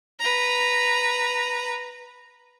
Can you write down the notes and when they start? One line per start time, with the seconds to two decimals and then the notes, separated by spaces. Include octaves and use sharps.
0.20 B4 A#5